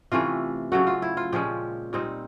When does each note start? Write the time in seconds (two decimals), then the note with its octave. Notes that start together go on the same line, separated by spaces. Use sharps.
0.11 C3 E3 A3 C#4 F4
0.72 C#3 F#3 A3 F#4
0.87 F4
1.02 E4
1.17 F4
1.32 A#2 F3 G#3 C#4 G4
1.93 A#2 G3 C4 D#4